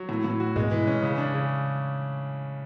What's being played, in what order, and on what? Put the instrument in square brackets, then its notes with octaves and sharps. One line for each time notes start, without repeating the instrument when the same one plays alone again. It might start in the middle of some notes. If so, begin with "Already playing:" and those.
Already playing: [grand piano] F#3
A2
A2
F#4
[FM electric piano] G#2 B2 [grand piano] G#3
[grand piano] E3
C#4
C#3
D4
C#3